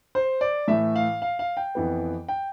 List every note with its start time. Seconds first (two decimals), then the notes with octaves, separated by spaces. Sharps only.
0.15 C5
0.41 D5
0.68 A2 E3 A3 E5
0.96 F5
1.22 F5
1.39 F5
1.57 G5
1.75 F2 E3 B3
2.28 G5